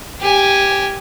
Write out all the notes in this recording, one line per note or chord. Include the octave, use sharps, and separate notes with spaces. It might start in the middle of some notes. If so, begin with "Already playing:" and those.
G4 G#5